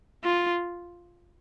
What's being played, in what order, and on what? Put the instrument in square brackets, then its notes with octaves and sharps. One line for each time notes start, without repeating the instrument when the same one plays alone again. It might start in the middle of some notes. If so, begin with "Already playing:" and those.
[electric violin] F4